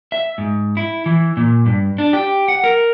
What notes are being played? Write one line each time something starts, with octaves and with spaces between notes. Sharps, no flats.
E5
G#2
E4
E3
A#2
G2
D4
G4
F#5
A#4